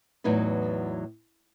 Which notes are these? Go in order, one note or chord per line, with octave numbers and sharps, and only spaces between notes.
E2 A2 F#3 D#4 B4